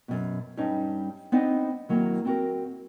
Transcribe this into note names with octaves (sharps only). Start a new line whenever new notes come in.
F#2 B2
G2 G3 C#4 D#4
B3 C4 D4 D#4 C5 D#5
D#3 F#3 A#3 E4
C4 F#4 A#4